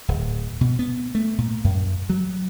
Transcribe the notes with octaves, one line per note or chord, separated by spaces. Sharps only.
D1
B2
B3
A3
A#2
F#2
F#3